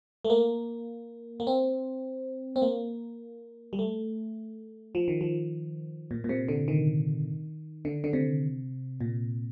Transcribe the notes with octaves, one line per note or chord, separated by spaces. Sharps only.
A3
A#3
A#3
C4
C4
A#3
G3
A3
F3
D#3
F3
A#2
A#2
C3
D3
D#3
D3
D3
C3
A#2